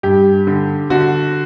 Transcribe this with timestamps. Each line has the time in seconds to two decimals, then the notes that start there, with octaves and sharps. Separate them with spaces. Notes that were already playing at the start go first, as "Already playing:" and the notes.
0.03 G2 G4
0.47 D3
0.90 D3 F#4